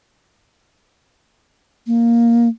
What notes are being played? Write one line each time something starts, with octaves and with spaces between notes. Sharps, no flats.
A#3